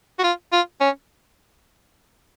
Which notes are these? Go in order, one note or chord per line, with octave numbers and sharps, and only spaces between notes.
F#4
F4
F4
C#4